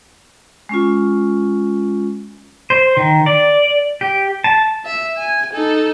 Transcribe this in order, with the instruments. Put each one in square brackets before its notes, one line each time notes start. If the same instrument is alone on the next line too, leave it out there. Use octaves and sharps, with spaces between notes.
[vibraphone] G#3 C#4 F4
[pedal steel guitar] C5
D#3
D5
G4
A5
[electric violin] E5
G#5
D#4 A4